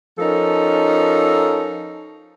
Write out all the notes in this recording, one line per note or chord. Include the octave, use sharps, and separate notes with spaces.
F3 C#4 D#4 A4 A#4